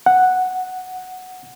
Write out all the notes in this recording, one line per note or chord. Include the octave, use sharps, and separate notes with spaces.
F#5